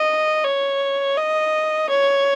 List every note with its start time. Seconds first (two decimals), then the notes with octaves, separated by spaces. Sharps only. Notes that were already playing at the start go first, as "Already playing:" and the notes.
Already playing: D#5
0.44 C#5
1.17 D#5
1.90 C#5